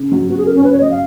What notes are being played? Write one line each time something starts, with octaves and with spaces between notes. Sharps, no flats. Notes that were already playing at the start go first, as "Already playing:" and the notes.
Already playing: C#3
F#3
B3 F#4
G#4
C#3 A#4
C#4
C#3 B4
C#5
F#3 D#5
F5